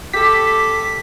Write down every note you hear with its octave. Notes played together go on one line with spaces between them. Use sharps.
G4 A4 B6